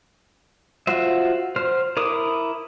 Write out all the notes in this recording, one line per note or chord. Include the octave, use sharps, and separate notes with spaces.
F4 F#4 C5 E5
C5 F6
E4 A#4 D6 D#6